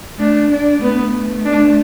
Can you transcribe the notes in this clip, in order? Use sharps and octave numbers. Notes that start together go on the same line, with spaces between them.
A3 D4
D4
A3 B3
D4